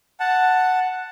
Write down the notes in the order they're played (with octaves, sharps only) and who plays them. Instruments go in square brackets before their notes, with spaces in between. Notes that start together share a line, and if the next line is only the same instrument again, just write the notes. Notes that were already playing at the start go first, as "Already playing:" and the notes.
[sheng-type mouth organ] F#5 A5